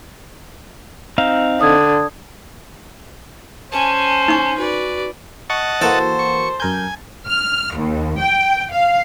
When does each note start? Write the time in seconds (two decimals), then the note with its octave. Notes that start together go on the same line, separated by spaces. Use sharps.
1.18 C4 D#4 F5
1.61 D3 D#6 G#6
3.72 C#4 C5 G#5 A5
4.28 D#4 C#6
4.57 F#4 B4 D5
5.50 D#5 F#5 A5 C#6
5.81 E3 A#3 F#4 A4 C5
6.19 C#6
6.60 F#2 A#4 G#5 G6
7.26 F6
7.76 D#2
8.18 G5
8.72 F5